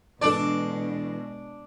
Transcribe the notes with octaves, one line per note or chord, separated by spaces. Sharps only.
B2 E3 G#3 D4 A4 D5